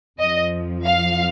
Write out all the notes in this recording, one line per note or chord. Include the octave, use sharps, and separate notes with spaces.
F2 F3 D#5
F5